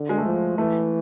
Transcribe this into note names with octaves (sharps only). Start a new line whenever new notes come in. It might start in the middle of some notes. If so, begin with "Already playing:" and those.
Already playing: D3
G#3
A3
F3
E3 A3